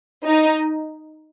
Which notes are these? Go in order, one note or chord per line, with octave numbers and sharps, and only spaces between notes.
D#4